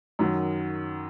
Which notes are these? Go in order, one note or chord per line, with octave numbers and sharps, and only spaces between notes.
F#2 D#3 F#3